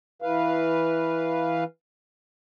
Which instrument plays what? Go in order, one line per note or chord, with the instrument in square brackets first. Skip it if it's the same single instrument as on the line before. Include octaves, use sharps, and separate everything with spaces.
[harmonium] E3 B4 F5